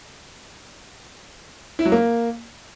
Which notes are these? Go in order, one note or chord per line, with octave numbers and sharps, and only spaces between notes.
E4
F#3
A#3